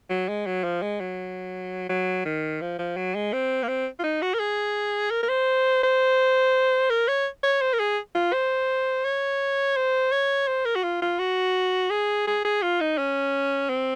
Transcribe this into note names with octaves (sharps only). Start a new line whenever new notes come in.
F#3
G#3
F#3
F3
G#3
F#3
F#3
D#3
F3
F3
F#3
G#3
C4
A#3
C4
F4
D#4
F#4
A#4
G#4
A#4
A#4
C5
C5
A#4
C#5
C#5
C5
A#4
G#4
F4
C5
C#5
C5
C#5
C5
A#4
F#4
F4
F4
F#4
G#4
G#4
G#4
F4
D#4
C#4
C4